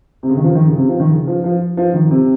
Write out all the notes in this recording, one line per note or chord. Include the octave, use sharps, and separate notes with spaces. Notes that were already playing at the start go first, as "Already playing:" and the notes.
C3
C#3
D#3
F3
D#3
C#3
C3
F3
D#3
C#3
F3
F3
F3
D#3
C3